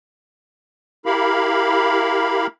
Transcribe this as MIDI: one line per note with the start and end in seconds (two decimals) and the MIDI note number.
1.06 2.47 64
1.06 2.47 67
1.06 2.47 70
1.06 2.47 77
1.06 2.47 83